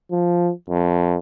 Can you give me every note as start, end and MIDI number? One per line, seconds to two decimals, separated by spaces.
0.11 0.52 53
0.70 1.18 41